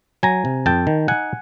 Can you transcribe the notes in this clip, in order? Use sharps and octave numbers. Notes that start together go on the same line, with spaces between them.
F#3 G#5 A#5
C3
F2 G5 A5
D#3
D#4 F#5 G#5